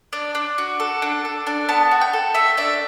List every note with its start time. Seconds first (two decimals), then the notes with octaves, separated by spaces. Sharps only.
0.13 D4
0.35 D4
0.58 F#4
0.80 A4
1.02 D4
1.25 A4
1.47 D4
1.69 B3 A5
1.91 F#4
2.01 G5
2.13 A4
2.35 A3 E5
2.57 D4 E5